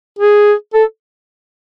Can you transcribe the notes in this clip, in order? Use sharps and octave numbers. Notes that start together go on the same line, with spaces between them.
G#4
A4